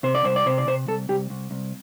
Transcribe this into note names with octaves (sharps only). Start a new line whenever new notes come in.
C3 C5
D5
C2 C5
D5
C3 C5
D5
C3 C5
C2 A4
C2 G4
C2
C2